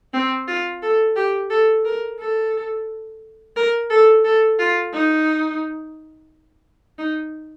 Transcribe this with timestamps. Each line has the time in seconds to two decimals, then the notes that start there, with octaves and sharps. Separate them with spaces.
0.13 C4
0.47 F4
0.82 A4
1.16 G4
1.50 A4
1.85 A#4
2.19 A4
3.56 A#4
3.90 A4
4.24 A4
4.59 F4
4.93 D#4
6.98 D#4